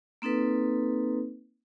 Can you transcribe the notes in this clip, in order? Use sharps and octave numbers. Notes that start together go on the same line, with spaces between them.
A#3 C4 D#4 A4 B4